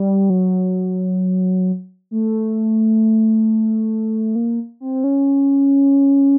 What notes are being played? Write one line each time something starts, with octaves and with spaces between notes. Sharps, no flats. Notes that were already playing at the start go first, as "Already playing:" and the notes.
Already playing: G3
F#3
A3
A#3
C4
C#4